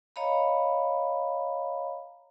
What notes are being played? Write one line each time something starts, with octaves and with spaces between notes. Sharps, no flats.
C#5 D#5 F5 A#5 B5